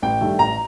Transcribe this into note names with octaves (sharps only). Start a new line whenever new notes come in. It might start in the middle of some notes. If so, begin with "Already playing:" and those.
A1 G5
G2 D#3 A3
A1 A#5